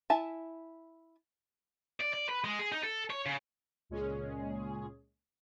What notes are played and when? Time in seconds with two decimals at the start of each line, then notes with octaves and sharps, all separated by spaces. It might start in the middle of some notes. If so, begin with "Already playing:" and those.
0.10 E4 E5 G#5 A5
2.00 D5
2.13 D5
2.29 B4
2.44 G#3
2.59 G#4
2.72 D#4
2.84 A4
3.10 C#5
3.26 C#3
3.89 C#2 A#2 G#3 C#4 G#4